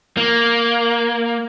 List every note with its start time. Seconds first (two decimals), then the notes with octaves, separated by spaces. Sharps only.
0.17 A#3